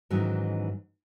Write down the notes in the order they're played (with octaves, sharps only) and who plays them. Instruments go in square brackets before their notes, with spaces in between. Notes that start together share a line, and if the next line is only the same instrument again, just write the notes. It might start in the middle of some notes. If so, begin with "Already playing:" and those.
[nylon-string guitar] G#2 D#3 E3 F#3 C#4